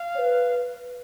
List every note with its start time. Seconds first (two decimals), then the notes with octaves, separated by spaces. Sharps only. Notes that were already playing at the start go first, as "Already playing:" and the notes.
Already playing: F5
0.15 C#5
0.18 B4